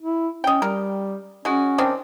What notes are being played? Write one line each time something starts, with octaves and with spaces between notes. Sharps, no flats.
E4
C#4 D#5 G5
G3 A#4
G#3 C#4 F#4
D#3 C4 D4